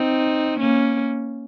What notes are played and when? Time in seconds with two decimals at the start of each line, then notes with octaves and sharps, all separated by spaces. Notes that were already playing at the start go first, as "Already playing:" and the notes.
Already playing: C4 D#4
0.60 A#3 C#4